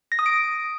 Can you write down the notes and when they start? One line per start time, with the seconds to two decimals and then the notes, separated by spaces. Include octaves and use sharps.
0.12 A#6
0.19 D#6
0.26 D7